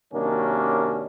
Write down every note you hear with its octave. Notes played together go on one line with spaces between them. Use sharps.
F#2 C3 D#3 A#3 C#4 D4